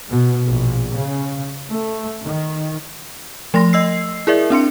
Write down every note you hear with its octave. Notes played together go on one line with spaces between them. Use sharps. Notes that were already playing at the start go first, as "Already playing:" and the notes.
B2
A#1
C#3
A3
D#3
F3 A3 C6 A#6
D#5 E6 C7
E4 G#4 A#4 D5 E5
C4 D4 C6 C#7